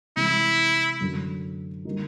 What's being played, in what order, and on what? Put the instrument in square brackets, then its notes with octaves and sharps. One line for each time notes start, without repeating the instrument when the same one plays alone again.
[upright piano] C3 E3 G#3 [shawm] E4
[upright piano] F#2 D3 F#3
D3 G3 A#3 D#4